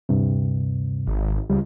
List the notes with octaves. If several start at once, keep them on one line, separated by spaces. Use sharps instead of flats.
D2 G2 C3
G#1
C#2 G3